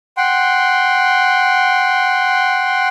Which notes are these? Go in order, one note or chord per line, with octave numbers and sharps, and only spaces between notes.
F#5 G5 C6